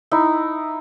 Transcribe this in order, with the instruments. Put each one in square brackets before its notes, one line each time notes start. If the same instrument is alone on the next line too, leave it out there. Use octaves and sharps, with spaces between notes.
[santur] D#4 E4